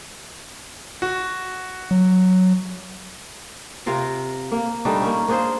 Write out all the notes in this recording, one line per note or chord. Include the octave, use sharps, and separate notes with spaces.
F#4
F#3
C3 F4 A#4 F5
A#3
G3 A3 D4 D#4
A#3 C#4
A#3 D4 G#4 C5